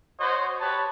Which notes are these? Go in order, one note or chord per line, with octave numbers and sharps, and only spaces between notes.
F#4 C5 C#5 D#5
G4 B4 C#5 A5